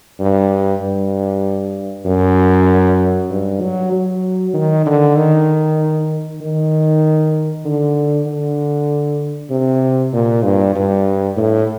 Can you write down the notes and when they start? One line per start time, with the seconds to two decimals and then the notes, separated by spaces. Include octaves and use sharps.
0.20 G2
0.82 G2
2.06 F#2
3.30 G2
3.61 F#3
3.92 F#3
4.54 D#3
4.86 D3
5.16 D#3
6.41 D#3
7.65 D3
8.26 D3
9.50 C3
10.13 A#2
10.44 G2
10.75 G2
11.37 A2